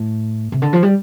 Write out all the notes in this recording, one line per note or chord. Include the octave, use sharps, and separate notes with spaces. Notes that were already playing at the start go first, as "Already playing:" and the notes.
Already playing: A2
C3
D3
F3
G3